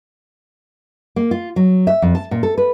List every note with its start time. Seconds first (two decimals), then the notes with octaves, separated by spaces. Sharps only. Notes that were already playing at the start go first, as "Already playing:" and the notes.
1.16 A#3
1.31 F4
1.56 F#3
1.87 E5
2.02 F2
2.15 A5
2.31 A#2
2.43 A4
2.58 B4